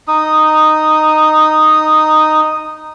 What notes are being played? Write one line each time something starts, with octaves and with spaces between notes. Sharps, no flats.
D#4 D#6